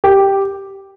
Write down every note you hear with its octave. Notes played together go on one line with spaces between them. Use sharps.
G4